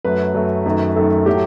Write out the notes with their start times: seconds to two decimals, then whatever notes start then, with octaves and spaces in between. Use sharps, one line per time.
0.05 F#2 F#3 A3 B4
0.34 F#2 F#3 A3
0.66 F#2 D#3 F#3 A3
0.96 F#2 D#3 F#3 A3 A4
1.26 A2 F#3 A3 G4